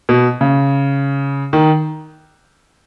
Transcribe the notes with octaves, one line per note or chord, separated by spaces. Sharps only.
B2
C#3
D#3